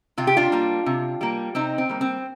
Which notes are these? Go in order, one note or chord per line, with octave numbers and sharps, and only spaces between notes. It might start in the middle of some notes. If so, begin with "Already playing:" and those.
C3 F4
G4
D4 F4
G3 A#3
C3
G3 A#3
C3 C4 D#4
C4
G3 A#3
C4